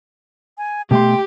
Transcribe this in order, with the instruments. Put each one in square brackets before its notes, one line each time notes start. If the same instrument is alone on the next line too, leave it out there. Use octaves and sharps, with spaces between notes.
[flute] G#5
[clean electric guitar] B2 A3 C6 [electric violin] G4 [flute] G5